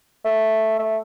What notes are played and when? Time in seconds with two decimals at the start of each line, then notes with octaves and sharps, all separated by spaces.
0.25 A3
0.79 A3